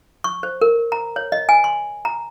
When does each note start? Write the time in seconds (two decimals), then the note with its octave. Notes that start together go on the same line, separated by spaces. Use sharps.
0.24 C#6
0.43 C5
0.61 A#4
0.92 A#5
1.16 C#5
1.32 D#5
1.49 G#5
1.64 C6
2.05 A#5